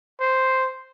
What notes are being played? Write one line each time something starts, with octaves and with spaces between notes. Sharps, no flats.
C5